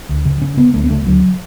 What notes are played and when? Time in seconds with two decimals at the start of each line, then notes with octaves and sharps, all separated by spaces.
0.09 D2
0.25 C#3
0.41 C#3 C#4
0.57 C#3 B3
0.74 D2 A3
0.84 B3
0.90 C#3 A3
1.06 D2 F#3